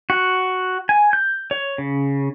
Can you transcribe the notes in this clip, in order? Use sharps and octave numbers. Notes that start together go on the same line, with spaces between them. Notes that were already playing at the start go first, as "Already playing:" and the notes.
F#4
G#5
G6
C#5
C#3